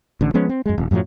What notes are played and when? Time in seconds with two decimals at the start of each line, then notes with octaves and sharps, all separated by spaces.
0.21 A1 D3
0.34 F3 G#3 B3 C#4
0.49 C4
0.66 F#2 G#3
0.78 D#1
0.91 F#2 A2 F3 F#3